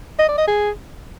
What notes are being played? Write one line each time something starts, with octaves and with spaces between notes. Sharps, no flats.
D#5
D5
D#5
G#4